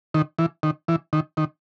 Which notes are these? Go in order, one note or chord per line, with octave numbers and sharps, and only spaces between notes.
D#3
E3
D#3
E3
D#3
D#3